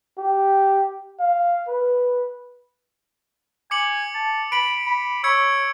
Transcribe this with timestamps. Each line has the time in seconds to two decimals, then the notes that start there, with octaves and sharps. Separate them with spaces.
0.18 G4
1.20 F5
1.68 B4
3.71 G#5 D6 C#7 F#7
4.15 A5
4.52 B5 D7 F#7
4.86 B5
5.24 C#5 E6 G#6 C#7